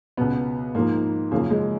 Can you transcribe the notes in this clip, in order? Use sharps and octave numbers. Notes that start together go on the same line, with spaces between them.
C#2 B2 B3
G#2 F3 A#3
F#2 C#3 F3 A#3
G#3